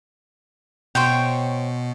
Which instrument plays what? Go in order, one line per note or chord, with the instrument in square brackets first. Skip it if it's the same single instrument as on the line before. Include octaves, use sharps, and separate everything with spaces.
[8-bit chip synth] B2 [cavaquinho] C5 C#5 G5